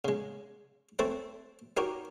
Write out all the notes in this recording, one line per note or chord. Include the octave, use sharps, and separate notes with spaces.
C#3 G#3
A3 C4 A4 C5 C#5 A5
D#4 F#4 G4 A#4 C#5